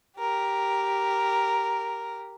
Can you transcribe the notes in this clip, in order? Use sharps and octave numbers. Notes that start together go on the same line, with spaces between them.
G4 A#4